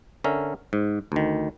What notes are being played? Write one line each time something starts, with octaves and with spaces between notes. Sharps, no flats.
D3 C#4 A#4 E5
G#2
D2 D#3